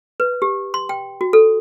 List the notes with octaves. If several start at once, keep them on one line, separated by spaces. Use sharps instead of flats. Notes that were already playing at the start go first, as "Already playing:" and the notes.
B4
G4
C6
G5
F#4
A4